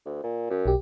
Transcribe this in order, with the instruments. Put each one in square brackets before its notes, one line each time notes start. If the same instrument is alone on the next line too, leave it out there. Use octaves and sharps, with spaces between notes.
[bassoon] D2
A#2
F#2
[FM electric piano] B1 G4